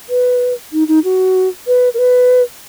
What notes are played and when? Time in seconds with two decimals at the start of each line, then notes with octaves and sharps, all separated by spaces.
0.09 B4
0.72 D#4
0.88 D#4
1.04 F#4
1.67 B4
1.94 A#4
1.98 B4